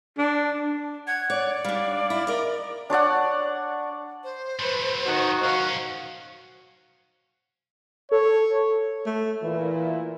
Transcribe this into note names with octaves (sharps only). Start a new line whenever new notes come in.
D4
F#5 G#6
C#5 D5
G3 D4 F5
E4
A#4 D#5
D4 C#5 D5 F#5
C5
F#3 A3 B4
D#3 F#4
B1 C#4 F5
A4 C#5
A3
A#2 E3 E4